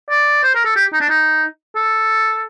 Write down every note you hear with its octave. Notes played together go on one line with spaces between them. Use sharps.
D5
C5
A#4
A4
G4
D#4
D4
D#4
A4